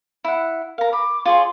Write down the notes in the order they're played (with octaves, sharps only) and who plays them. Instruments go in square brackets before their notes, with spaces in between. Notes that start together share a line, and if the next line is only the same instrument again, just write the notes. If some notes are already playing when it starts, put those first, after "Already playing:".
[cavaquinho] E4 F#5
[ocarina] A#4 [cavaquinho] F5 A#5
[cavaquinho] B5 [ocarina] D6
[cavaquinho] F4 G#4 C#5 [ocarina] C6